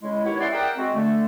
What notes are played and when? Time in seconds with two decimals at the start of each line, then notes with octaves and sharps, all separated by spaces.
0.02 C#3 G#3 E4
0.24 D#3 B3 E4 G4 C#5
0.40 C#4 E4 D5 F#5 C6
0.52 G#4 A#4 D5 E5 F#5 G5
0.77 G#3 C4 F#4
0.94 D3 A3